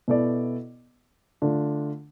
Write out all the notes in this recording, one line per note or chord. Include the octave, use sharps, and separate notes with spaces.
B2 B3 E4 A4 D5
D3 A3 D4 F4